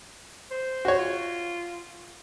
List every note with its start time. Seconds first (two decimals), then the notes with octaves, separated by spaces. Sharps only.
0.51 C5
0.85 F#4 C#5
0.98 F4